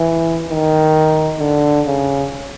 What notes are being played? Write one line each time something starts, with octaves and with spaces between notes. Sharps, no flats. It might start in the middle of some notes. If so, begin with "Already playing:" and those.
Already playing: E3
D#3
D3
C#3